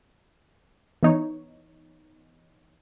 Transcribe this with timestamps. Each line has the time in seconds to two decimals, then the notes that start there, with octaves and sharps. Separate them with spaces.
1.03 E3 B3 D#4 C#5